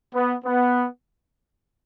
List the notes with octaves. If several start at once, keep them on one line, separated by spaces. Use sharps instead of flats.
B3
B3